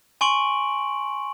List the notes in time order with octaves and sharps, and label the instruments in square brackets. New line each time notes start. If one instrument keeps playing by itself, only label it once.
[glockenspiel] G#5 C6 C#6 D7 F#7